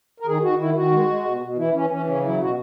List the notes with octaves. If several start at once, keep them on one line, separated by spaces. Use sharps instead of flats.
A#4
D#3 G#4
D#3 F#4
D#3 E4
D#3 F#4
G#3
G#3
B2
B2
E3 E4
E3 C#4
E3 C#4
C#3 C#4
F#3 E4
B2 F#4